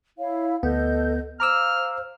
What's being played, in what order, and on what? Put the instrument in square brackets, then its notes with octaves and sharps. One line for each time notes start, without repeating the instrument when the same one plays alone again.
[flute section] E4 C#5 F5
[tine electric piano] D2 B3 [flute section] A4 D#5 G6
[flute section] C5 F5 [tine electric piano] A#5 D6 E6 [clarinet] F6